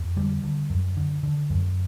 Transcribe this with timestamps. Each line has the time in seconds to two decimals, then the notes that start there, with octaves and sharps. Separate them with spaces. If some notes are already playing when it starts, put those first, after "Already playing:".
Already playing: F2
0.16 D3 G3
0.43 D3
0.70 F#2
0.97 D3
1.23 D3
1.50 F#2